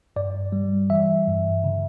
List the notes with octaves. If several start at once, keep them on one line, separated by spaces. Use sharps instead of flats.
G2 D5
G3
E3 E5
G2
C#3